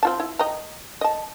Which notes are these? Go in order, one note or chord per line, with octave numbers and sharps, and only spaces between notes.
C4 F4 A5
E4
D#5 G5 A#5
D#5 A5